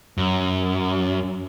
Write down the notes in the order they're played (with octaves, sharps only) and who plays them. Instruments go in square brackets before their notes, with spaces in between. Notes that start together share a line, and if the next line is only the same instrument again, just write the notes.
[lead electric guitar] F#2